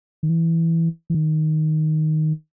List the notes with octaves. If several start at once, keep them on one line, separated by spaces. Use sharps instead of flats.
D#3
E3
E3
D#3